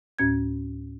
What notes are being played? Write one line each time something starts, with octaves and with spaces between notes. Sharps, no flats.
D2 A2 C#4 G#6